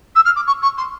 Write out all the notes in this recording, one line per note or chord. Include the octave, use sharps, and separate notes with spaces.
E6
F6
D6
C#6
C#6
C6